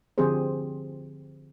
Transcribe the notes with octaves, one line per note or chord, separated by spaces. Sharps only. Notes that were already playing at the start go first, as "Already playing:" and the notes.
D3 F3 C4 G4 G#4 C5